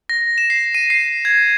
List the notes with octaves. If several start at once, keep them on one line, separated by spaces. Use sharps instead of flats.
A#6
E7
C7
D#7
C7
G#6